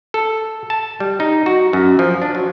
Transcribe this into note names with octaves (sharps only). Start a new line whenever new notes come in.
A4
A5
G3
D#4
F#4
F#2
F3
D4
F#3